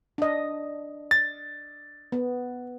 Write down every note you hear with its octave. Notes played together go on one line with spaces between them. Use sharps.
D4 D#5
A6
B3